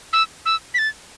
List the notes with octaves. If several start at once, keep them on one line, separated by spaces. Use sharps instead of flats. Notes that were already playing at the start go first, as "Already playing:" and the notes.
E6
E6
B6
A6